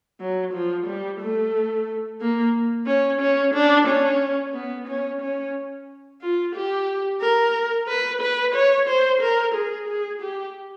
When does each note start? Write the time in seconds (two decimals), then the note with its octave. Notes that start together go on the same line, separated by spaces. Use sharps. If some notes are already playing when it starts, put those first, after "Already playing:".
0.20 F#3
0.53 F3
0.87 G3
1.20 A3
2.21 A#3
2.87 C#4
3.21 C#4
3.54 D4
3.87 C#4
4.54 B3
4.88 C#4
5.21 C#4
6.21 F4
6.55 G4
7.21 A#4
7.88 B4
8.21 B4
8.55 C#5
8.88 C5
9.21 A#4
9.55 G#4
9.88 G#4
10.22 G4